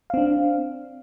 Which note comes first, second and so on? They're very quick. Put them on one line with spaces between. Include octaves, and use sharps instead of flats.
F5 C4 D4